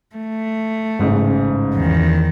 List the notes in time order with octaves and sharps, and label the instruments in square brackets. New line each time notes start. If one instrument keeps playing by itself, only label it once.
[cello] A3
[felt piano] A1 G#2 C#3
[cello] E2 D#3